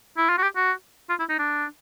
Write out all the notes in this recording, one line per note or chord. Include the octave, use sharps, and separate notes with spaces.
E4
F4
F#4
G4
F#4
F4
E4
D#4
D4